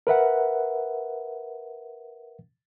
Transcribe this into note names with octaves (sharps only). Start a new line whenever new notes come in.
A#4 B4 E5 F#5